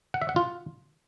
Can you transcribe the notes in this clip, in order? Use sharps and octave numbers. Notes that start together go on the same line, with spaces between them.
F#5
E5
F#5
F4